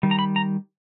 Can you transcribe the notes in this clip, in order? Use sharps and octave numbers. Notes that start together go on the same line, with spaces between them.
D#3 G3
A#5
B5
A#5